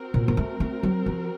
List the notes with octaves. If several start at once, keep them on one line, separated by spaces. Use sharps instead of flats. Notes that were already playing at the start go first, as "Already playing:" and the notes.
Already playing: C4 F#4 A#4
A#2
A#3
A3
A3
F#3
F3